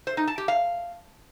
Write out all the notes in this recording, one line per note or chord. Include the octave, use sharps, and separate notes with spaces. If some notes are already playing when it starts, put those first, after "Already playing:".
C5
D#4
A5
G4
F5